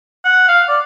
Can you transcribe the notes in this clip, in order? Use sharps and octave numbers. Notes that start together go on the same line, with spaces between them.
F#5
F5
D5